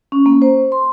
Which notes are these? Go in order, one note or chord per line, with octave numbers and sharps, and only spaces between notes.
C#4
A#3
C5
C6